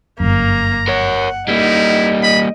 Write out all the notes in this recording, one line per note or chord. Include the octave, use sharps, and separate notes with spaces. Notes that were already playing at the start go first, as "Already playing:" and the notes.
G1 F#2 A#3 A#5
A#4 C#5 F#5
G3 A#3 D#4 E4
D#5 B5